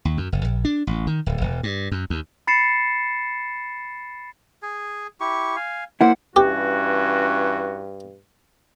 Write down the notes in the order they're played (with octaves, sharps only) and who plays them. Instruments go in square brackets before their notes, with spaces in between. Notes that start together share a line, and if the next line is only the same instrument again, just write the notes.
[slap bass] D#2
F#2
F#1
A#1
D4
A1
D#3
D1
E1
G2
F#2
D#2
[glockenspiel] B5 A6 C7 C#7 E7
[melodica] G#4 G#5
E4 G4 C#6
F5 G#5
[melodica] F#3 C5 [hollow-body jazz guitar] A#3 E4 [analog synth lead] F#5
[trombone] G2 [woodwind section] E3 C#4 F#4 [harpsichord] G4